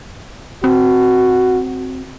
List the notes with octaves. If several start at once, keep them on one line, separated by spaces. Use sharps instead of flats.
C4 F#4